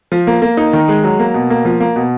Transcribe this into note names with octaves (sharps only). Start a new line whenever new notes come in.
F3
A#3
A#3
D#4
D#3
G#3
F#3
A#3
B2
A#3
F3
A#3
B2